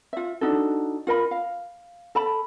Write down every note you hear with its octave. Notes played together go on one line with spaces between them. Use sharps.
F4 E5
D4 D#4 F#4 A4
F4 A#4 D#5 B5
F5
A4 A5 B5